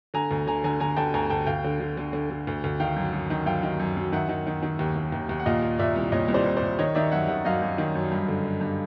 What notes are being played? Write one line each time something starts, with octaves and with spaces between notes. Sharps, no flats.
D3 G#5 A#5
D2
D3 G#5 A#5
D3 G#5 A#5
D3 G#5 A#5
D3 G5 A5
D2 G#5 A#5
D2 G5 A5
D2 F5 G5
D3
D3
D3
D3
D3
D2
D2
D#3 F5 G5
F#2
F#2
D#3
F#2 F5 G5
D#3
F#2
F#2
D#3 E5 F#5
D#3
D#3
D#3
D#2
D#2
D#2
D#2
F#5
A#2 D#5 F5
A#2
A#2 D5 E5
C2
A#2 C#5 D#5
C2
C5 D5
C2
C5 D5
A#2
D#3 C#5 D#5
D#3 D5 E5
F#2 E5 F#5
D#3 E5 F#5
F#2 D#5 F5
F#2
D#3
F#2
G2
D3
D3
G2